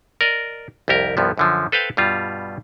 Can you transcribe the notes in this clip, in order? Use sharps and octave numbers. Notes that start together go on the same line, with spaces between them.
A#4 D5 D#5
C2 F2 G4 A#4
C2 G2 F3 B3
F#2 D3 F3
A4 B4 C5 F5 G5
G2 B2 G3 F4